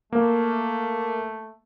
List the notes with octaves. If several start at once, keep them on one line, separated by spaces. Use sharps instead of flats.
A3 A#3